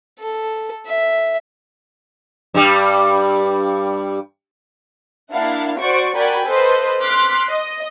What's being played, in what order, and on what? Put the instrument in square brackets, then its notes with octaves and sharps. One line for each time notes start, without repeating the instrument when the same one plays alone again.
[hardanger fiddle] A4
E5
[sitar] G2 G3
[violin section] A#3 D4 E4 F5 F#5
F#4 C5 D5 C#6 D7
F#4 A#4 D5 G5 G#5 B5
A4 B4 C5 D#5
C6 D6 F6 F#6 B6
D#5